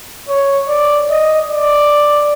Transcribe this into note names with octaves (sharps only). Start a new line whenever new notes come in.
C#5
D5
D#5
D5